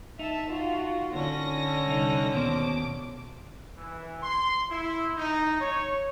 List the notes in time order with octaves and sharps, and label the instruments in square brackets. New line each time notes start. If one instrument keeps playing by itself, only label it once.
[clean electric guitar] D#4 [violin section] E5 A5
[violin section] F4 F#4
[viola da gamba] D3 C#4 [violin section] A#6
[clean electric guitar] C2 D#4
[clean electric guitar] D#2 B2 C5 [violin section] D6
[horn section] E3
C6
E4
D#4
C#5